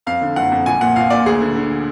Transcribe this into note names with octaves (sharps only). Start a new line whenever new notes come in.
F2 F5
D3
F#1 F#5
F2
A#1 G#5
A#2 F#5
A#1 F5
A#2 D5
D2 G#4
D3
D3